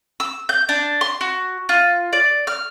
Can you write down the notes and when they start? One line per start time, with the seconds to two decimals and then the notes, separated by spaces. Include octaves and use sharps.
0.20 E6
0.49 G6
0.69 D4
1.01 C6
1.21 F#4
1.69 F4
2.13 D5
2.47 F6